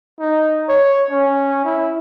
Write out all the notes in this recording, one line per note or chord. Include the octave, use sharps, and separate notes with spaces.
D#4
C#5
C#4
E4